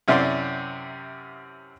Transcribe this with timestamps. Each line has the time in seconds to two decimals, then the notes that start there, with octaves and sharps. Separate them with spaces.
0.08 F#2 C3 E4 D5 F#5 C6